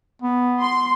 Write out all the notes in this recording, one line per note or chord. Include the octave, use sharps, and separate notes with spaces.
B3
C6